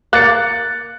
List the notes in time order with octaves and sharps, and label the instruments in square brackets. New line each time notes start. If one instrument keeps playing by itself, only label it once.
[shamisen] A#3 [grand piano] F#6 A6 C#7